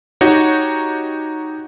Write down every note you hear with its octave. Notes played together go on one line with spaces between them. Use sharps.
D#4 F#4 G4 C#5